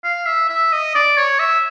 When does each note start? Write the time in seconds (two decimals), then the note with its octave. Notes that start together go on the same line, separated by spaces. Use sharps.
0.04 F5
0.27 E5
0.49 E5
0.73 D#5
0.95 D5
1.18 C#5
1.39 E5